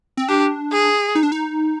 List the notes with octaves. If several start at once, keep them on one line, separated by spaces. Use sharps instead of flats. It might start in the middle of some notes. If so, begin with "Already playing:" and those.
C4
D4 G4
G#4
D#4
D4
D#4